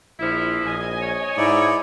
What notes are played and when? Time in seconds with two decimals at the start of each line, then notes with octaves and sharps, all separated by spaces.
0.19 A#1 F3 E4
0.64 A#1 D#5 G#5
1.01 C#5
1.37 G#2 D#4 E4 D5